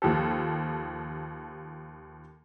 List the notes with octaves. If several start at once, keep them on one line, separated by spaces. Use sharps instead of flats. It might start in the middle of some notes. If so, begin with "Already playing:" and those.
D#2 F3 G4 A4